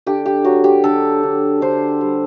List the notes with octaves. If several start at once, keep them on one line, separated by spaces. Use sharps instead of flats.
D3 G4
G4
F#3 F#4
G4
D3 A4
D3
D3 C5
G3